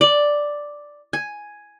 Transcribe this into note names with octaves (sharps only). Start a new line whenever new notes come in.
D5
G#5